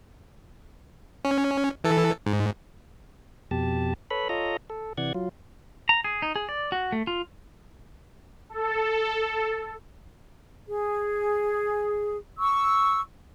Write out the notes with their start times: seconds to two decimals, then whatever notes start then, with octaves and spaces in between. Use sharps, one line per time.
1.25 C#4
1.84 E3 A4
2.26 G#2
3.51 F2 B2 G4 A5
4.10 A4 B4 C#5 B5
4.29 F4 A4 C#5 D#5 A#5
4.70 A4
4.98 C3 E3 D5 F#5 G#6
5.15 F#3 F4
5.89 A#5
6.04 G#4
6.22 D#4
6.36 G#4
6.49 D5
6.72 F#4
6.92 A3
7.07 F4
8.49 A4
10.67 G#4
12.39 C#6 E6